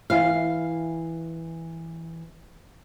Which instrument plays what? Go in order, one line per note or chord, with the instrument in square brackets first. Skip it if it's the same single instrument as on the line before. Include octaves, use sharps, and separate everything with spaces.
[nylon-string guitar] E3 F5